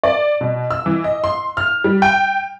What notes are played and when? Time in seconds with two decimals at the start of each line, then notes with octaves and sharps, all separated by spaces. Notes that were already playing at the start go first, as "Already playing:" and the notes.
0.04 D5
0.41 B2
0.71 E6
0.86 E3
1.04 D#5
1.24 C6
1.57 F6
1.84 G3
2.02 G5